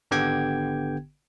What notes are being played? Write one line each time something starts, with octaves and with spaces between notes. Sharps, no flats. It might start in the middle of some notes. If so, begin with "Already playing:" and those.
G#1 D3 B3 G4 G5 G#6